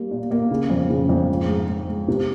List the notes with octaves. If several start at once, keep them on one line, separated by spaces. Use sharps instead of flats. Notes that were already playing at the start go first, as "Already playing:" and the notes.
Already playing: G3 A#3
A#2
A#3
C#3
F2
C#3
F2
G#2
G#2
G#2
G#2
C3